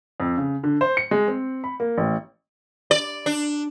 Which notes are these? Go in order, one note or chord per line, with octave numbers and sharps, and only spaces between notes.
F2
C#3
D3
C5
C#7
G#3
C4
B5
A#3
A1
D5
D4